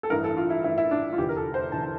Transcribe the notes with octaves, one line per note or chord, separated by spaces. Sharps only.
A4
A1 G2 E3 A#4
A4
F4
E4
A1 G2 E3 E4
E4
D4
F4
F1 E2 D3 G4
A#4
A4
C5
F1 E2 D3 A5
A5